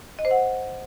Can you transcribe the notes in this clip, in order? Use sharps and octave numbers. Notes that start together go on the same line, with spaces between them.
D#5
C5
F#5